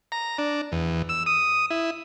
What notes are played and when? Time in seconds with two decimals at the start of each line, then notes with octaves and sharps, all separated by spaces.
0.12 A#5
0.38 D4
0.72 E2
1.09 E6
1.26 D#6
1.71 E4